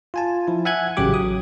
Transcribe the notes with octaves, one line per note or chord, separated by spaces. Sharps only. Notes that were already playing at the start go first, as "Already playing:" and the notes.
F4 G#5 A5
F3 E4
E5 F#5 G#5 F#6 G#6
A1 C#3 F#3 G4 D6
F#3 D#6